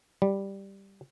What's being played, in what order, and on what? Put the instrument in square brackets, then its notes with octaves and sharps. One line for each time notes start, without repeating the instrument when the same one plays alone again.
[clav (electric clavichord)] G3